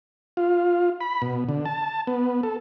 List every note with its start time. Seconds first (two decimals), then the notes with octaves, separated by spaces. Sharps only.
0.37 F4
1.01 B5
1.22 B2
1.49 D3
1.65 A5
2.07 B3
2.43 A4